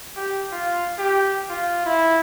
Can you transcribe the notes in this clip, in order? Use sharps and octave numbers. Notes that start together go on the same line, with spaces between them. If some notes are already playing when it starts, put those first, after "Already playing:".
G4
F4
G4
F4
E4